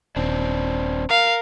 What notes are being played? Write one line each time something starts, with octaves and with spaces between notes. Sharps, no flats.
D#1 C4 D4
A#4 F5